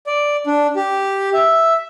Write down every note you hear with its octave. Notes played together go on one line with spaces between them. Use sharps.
D5
D4
G4
E5